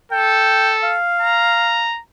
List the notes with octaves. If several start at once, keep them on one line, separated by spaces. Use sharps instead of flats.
A4 G5
F5
A#5